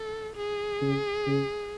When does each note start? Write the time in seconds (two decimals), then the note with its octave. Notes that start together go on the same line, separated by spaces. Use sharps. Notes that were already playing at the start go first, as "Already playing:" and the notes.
Already playing: A4
0.36 G#4
0.82 C#3
1.27 C#3